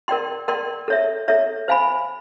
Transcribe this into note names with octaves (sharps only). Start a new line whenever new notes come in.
A#4 D5 G5 C6
A#4 D5 G5 C6
A4 C#5 E5
A4 C#5 E5
C5 F5 G#5 B5